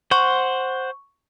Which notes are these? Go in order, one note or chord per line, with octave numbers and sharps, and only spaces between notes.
C5 F#5 C#6